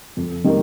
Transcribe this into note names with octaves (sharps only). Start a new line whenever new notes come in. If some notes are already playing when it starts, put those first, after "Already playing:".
F2
D#3 G3 A#3